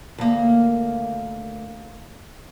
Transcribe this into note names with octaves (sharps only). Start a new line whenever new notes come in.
D2 A#3